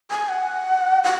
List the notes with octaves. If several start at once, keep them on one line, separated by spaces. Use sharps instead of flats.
G#5
F#5
F#5